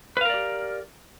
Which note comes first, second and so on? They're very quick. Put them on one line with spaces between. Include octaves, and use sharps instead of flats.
B4 F5 A#4 D5 G4